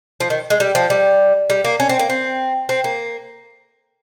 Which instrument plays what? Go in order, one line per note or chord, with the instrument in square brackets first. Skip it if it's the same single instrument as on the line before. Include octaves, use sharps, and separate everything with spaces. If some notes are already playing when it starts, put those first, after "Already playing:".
[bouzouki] F3
D#3
G#3
G3
F3
G3
G3
A#3
C#4
C4
A#3
C4
C4
A#3